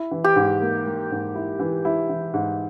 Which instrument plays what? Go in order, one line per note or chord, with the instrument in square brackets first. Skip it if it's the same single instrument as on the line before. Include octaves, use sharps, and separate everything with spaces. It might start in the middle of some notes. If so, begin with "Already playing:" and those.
Already playing: [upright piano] E4
E3
[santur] G4
[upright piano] G#2
A#3
A#3
G#2
E4
E3
E4
E3
G#2